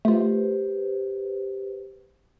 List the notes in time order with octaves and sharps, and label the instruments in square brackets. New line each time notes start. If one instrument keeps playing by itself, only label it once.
[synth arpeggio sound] A3 F4 [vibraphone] G4 B4 C5